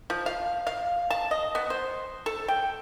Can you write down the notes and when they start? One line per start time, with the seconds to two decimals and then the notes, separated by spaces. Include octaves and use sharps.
0.10 F3
0.26 F5
0.67 F5
1.10 A5
1.31 D#5
1.55 B3
1.70 C5
2.26 A4
2.48 G5